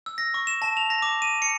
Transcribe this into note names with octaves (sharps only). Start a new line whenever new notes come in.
E6
A#6
C#6
E7
A5
F7
A#6
D6
D#7
C#7